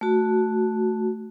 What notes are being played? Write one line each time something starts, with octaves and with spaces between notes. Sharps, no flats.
A3 F#4